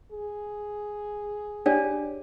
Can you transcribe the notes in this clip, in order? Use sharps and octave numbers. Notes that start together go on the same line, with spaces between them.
G#4
D4 G4 C#5 D5 G#5